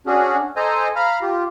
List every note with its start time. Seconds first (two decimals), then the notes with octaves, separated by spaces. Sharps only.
0.06 C#4 D4 F#4 G#4
0.56 A4 C5 D#5 G#5 A#5
0.96 F5 A#5 B5 F6
1.22 F4 G4